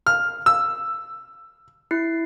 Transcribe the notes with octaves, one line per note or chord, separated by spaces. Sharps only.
F6
E6
E4 C7